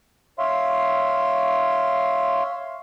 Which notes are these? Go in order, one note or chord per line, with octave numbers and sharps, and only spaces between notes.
C#5 E5 F5 C6